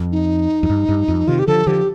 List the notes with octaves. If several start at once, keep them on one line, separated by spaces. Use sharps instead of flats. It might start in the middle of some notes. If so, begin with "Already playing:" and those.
Already playing: F2
D#4
F2
G2
G2
F2
C3 D#3 F4
G4
D3 F3 A4
D3 F3 G4